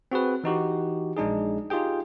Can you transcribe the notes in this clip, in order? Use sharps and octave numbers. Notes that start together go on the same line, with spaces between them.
C4 F#4 G#4 B4
E3 D#4 F#4 G4
A#1 G#3 D4 D#4 G#4
D#4 F4 G4 G#4 G5